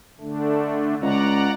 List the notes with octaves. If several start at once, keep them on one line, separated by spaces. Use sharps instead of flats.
D3 A3 D4
C#2 D5 F#5 A#5